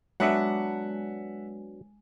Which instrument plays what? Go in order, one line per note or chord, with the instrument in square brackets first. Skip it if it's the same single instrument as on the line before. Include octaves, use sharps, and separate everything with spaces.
[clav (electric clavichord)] F#3 B3 D4 [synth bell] G#3 G#5 [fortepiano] E5 F#5